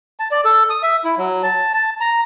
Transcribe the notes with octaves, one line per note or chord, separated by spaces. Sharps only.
A5
D5
A4
D#6
E5
E4
F#3
A5
A5
A#5